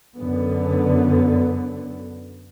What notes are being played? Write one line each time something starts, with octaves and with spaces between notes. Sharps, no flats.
F#2 D3 B3